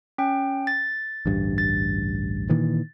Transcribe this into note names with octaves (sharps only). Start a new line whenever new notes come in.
C#4 G5
A6
A1 D2 G2
A6
A#2 D#3 E3